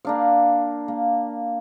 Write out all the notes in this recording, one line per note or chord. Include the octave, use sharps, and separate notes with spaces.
A#3 D4 F5
A#3